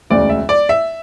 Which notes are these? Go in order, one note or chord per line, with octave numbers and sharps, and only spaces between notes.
E1 D2 C#3 D5
E5
D5
E5